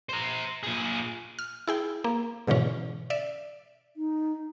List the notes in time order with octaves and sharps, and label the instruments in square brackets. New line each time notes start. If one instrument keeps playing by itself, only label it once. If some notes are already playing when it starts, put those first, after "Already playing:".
[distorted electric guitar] C5 A#5
A#2 G#4
[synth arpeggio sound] F6
E4 G#4 G5
A#3
G#2 B2 D3 E3 C#4
D5 E5
[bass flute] D#4